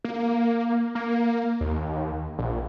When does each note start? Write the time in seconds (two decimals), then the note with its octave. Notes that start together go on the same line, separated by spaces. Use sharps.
0.04 A#3
0.95 A#3
1.61 D#2
2.39 A#1